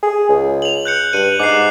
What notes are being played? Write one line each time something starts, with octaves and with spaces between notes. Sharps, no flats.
G#4
C#2
F7 F#7
F#6 G6 C#7
G2 D#7 F#7
G#2 D6 F#6 C7